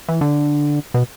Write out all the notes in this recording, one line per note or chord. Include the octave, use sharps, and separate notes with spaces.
E3
D3
B2